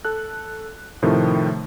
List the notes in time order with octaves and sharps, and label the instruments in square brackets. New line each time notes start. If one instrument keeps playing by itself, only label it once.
[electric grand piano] A4 F#6
A2 C3 D#3 F3 A3